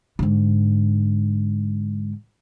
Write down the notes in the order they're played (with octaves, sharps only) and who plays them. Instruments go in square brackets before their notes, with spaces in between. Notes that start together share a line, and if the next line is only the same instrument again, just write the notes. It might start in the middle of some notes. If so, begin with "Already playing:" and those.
[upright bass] G#2 D3